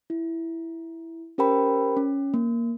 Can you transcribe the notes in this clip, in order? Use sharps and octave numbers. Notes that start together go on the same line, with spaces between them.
E4
C#4 G4 A#4 C5 G5 B5
C#4
A#3